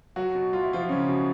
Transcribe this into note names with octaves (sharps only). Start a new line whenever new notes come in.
F#3 F#4
B2
F#3 F4
E4
F3 F#3 F4
C#3 F#3 C#4
B2